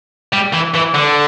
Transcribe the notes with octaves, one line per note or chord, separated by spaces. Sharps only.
G3
E3
E3
D3